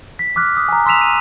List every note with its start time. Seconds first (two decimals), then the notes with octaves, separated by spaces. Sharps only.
0.19 B6
0.36 D6 F6 F#6 B6
0.57 D#6
0.68 G#5 A#5
0.86 C6 E6 B6 E7 F7
1.01 D#7